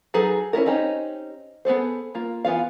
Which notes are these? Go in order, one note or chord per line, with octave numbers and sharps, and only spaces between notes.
F#3 D#4 G#4 A4 B4
C#4 E4 A4 A#4
C4 C#4 D#4 G4
B3 G#4 A4 C5
A#3 F4
E3 B3 F4 F5